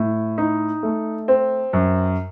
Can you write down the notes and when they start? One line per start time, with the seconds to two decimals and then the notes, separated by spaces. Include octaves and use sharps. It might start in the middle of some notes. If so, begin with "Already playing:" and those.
Already playing: A2
0.38 D#4
0.83 A3
1.28 C4
1.73 F#2